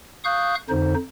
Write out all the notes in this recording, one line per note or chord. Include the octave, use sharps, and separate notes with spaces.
F5 C#6 D#6 F#6 G6
F2 D3 D#4 C5